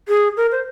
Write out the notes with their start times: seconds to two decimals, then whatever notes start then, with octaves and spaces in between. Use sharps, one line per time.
0.08 G#4
0.37 A#4
0.52 C5